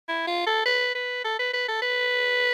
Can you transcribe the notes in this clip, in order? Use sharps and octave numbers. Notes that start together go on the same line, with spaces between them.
E4
F4
A4
B4
B4
A4
B4
B4
A4
B4